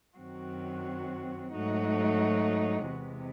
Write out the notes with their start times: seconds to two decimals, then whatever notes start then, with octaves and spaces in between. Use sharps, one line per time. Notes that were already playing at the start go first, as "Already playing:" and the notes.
0.17 F#2 D#3 F#3 C4 F#4
1.52 G#2 F#3 A3 D#4 F#4
2.86 E2 C3 E3 G#3